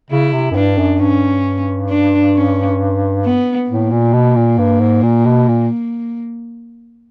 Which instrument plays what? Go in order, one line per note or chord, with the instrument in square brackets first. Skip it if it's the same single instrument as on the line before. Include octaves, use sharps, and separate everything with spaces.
[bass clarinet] C#3 [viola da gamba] E4
[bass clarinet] C3
F#2
[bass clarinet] G2 [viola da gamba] D4
[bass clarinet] F#2
[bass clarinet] G2 [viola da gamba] C#4
[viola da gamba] D4
C#4
B3
[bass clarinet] A2 [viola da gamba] A#3
[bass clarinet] A#2
B2
A#2
G2
G#2
A#2
B2
A#2